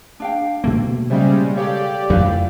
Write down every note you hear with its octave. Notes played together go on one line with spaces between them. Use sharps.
D4 F5 G5
B2 A3 A#3
C#3 G3 G#3 C5 E5
G4 A4 C#5 D5 F5
F2 F#3 A3 E4 B4 F5